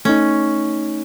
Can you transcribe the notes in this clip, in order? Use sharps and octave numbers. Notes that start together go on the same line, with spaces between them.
A3 C#4 D#4